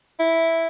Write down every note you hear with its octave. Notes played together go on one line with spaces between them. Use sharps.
E4